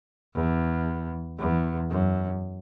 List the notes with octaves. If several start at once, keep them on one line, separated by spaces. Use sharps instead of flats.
E2
E2
F#2